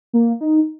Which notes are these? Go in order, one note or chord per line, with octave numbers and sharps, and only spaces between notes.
A#3
D#4